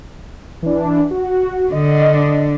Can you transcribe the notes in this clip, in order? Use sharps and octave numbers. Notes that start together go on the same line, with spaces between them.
E3 D4
F#4
D3 D4 D#5